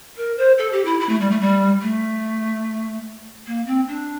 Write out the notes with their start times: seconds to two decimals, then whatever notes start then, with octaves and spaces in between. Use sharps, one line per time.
0.17 A#4
0.38 C5
0.58 A4
0.72 G4
0.85 E4
1.00 E4
1.09 A3
1.20 G3
1.31 A3
1.41 G3
1.82 A3
3.47 A#3
3.66 C4
3.87 D4